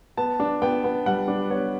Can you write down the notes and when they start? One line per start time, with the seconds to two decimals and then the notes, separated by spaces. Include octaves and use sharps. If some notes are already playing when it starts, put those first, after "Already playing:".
0.17 B3 A5
0.40 D4
0.62 B3 G5
0.84 B3
1.06 G3 F#5
1.28 D4
1.50 B3 C#5